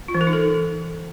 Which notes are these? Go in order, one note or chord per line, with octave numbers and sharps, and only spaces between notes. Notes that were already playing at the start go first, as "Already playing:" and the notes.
F4
E3
A#4
D#4
A4